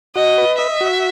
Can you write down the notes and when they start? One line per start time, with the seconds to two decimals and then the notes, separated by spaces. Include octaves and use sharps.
0.15 F#4 D#5
0.38 B4
0.58 D#5 E5
0.81 F#4